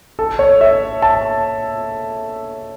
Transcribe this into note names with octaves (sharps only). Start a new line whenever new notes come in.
A4
C#5
E5
A5